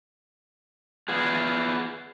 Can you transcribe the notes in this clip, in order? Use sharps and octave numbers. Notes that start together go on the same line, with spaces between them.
B3 F4 G#4